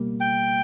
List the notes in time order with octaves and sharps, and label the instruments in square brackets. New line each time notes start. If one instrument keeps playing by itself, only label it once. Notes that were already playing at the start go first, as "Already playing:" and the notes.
Already playing: [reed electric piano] C#2 B2 G3 A#3
[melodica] G5